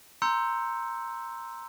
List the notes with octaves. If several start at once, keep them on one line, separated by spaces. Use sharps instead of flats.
A#5 C6 E6 G6 C#7